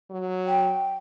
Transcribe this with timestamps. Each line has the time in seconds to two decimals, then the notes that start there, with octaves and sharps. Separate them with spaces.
0.11 F#3
0.47 G5